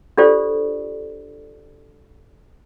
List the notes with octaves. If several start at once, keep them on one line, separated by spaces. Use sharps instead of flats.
D4 F4 G4 A4 C5 D5